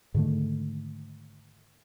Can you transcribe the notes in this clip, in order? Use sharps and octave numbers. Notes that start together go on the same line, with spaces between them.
G#2 D3 D#3 A3